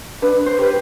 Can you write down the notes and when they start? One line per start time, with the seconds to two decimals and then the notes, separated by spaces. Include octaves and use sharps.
0.22 D4 B4
0.46 C5
0.59 G4 B4